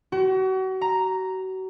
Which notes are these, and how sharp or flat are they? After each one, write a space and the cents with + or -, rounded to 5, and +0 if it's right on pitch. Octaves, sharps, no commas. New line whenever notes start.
F#4 +35
A#5 +0